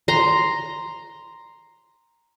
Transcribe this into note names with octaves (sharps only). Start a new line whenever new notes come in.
A#5 C6